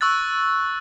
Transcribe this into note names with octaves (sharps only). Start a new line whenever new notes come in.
C#6 E6 F#6 A6